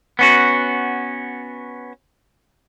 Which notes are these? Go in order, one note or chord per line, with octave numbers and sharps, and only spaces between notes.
B3 C#4 F#4